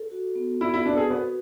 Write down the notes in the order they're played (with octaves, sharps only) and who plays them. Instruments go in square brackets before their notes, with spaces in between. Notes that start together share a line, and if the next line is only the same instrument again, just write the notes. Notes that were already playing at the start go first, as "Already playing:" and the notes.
Already playing: [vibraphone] A4
F#4
B3
[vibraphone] B3 [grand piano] E4
[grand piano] E4
[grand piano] D4 [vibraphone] B4
[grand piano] A4
G#4
[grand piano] B3 [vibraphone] F#4